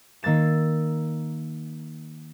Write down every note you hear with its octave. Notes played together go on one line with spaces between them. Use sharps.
D#3 A#3 E6 A6 E7